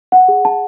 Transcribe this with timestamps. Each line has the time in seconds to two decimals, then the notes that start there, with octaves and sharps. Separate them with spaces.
0.12 F#5
0.28 G#4
0.45 A5